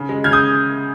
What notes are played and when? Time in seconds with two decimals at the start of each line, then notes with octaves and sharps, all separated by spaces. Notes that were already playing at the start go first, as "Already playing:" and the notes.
Already playing: C#3
0.09 G#3
0.24 C#3 F6 G#6
0.32 D#6 G6